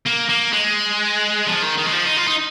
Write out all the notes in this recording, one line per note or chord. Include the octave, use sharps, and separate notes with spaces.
A#3
A#3
G#3
F3
D#3
D#3
G#3
F3
D#4
F4
D#4